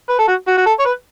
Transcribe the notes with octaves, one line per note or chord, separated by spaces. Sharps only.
B4
A4
F#4
F#4
F#4
A4
C#5
B4